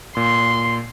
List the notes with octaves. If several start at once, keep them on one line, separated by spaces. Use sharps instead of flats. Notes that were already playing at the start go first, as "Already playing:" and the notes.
A#2 C6